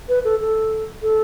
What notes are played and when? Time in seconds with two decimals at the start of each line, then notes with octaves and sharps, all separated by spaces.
0.09 B4
0.25 A4
0.40 A4
1.02 A4